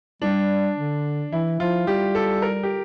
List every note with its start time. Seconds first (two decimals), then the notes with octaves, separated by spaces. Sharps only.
0.22 G3 D4
0.77 D3
1.32 E3 E4
1.60 F3 F4
1.87 G3 G4
2.15 A4
2.42 A#4
2.63 G4